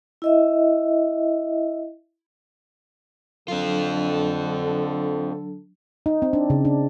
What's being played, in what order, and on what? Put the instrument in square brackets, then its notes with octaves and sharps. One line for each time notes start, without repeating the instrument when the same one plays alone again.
[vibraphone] E4 D#5 E5
[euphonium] D3 [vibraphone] F#3 D4 [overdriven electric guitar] C4 F4 [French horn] A4
[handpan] D#4
C4
D4
C#3
D4